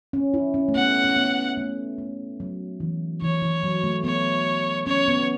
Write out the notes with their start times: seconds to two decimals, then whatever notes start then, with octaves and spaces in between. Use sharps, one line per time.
0.13 C#4
0.34 E4
0.54 C#4
0.68 A3
0.75 B3 F#5
1.04 C#4
1.17 B3
1.57 A3
1.98 A3
2.40 F#3
2.80 E3
3.22 E3 C#5
3.42 E3
3.63 F#3
3.83 A3
4.04 B3 C#5
4.86 C#4 C#5
5.08 B3